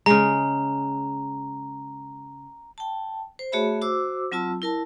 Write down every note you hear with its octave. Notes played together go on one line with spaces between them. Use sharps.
C#3 G#3 A#5
G5 A5
C5
A3 F#4 G#4 C#5 E5 B5
F#4 C5 D6 E6
F#3 C4 F4 A5 E6
E4 A#4 A5